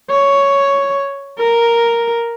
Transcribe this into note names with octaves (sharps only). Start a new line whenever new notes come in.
C#5
A#4